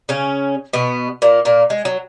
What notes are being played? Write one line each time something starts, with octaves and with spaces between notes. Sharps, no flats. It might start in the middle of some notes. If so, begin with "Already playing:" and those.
C#3 C#4
B2 B3
A#2 A#3
A#2 A#3
G#3
F#3